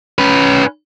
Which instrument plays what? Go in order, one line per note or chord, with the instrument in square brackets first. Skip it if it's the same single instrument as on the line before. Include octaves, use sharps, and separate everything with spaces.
[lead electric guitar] C#4 B4